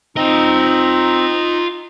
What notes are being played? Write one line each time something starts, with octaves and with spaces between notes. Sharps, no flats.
C4 D#4 F4 D#5 A#5